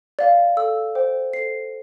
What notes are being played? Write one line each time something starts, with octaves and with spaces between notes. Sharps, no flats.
D5 F5
A4 E6
C5 G5
A4 C7